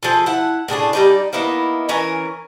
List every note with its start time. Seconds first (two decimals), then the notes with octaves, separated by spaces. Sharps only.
0.03 F3 G#4 A4
0.26 E4 F#5
0.68 A2 C#3 D4 G#4
0.93 G3 D#4 D5
1.33 A#3 B3 D#4 E4
1.89 E3 C#4 A#4 G#5